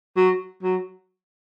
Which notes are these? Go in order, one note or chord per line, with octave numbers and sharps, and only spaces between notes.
F#3
F#3